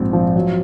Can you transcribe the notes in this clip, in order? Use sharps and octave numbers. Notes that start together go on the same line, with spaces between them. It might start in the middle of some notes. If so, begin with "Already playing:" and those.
Already playing: A#1 G#2 C4
F3
F#3